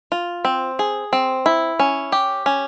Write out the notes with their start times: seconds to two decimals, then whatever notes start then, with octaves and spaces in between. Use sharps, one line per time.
0.12 F4
0.45 C4
0.79 G#4
1.13 C4
1.46 E4
1.79 C#4
2.12 G4
2.46 C#4